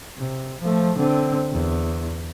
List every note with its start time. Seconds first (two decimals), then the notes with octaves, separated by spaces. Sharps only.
0.18 C3
0.61 F3 A3
0.98 D3 C4
1.53 E2